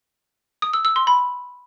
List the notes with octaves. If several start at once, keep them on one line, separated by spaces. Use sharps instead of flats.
D#6
E6
E6
C6
B5